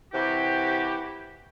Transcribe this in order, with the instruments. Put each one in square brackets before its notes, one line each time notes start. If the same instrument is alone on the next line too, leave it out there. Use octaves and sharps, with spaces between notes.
[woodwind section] C3 E3 E4 F#4 G4